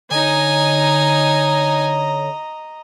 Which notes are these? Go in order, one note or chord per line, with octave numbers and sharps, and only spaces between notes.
D3 D#4 C#5 D#5 G#5 A#5